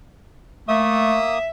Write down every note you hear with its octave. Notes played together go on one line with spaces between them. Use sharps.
A3 A#3 E5 D#6